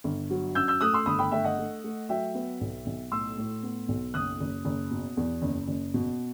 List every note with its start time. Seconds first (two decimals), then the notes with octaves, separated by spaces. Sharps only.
0.04 G1
0.30 F#3
0.55 F#2 E6 G6
0.68 E6 G6
0.81 A3 D#6 F#6
0.93 C6 E6
1.06 G1 B5 D#6
1.19 G5 B5
1.32 A3 E5 G5
1.44 D#5 F#5
1.58 A3
1.84 A3
2.09 F#3 E5 G5
2.35 B3
2.61 B1
2.86 B1
3.11 A2 C6 E6
3.38 A2
3.63 B3
3.88 B1
4.14 F#1 D#6 F#6
4.40 F#1
4.65 F#1
4.91 B2
5.17 E2
5.42 F#1
5.68 F#1
5.94 B2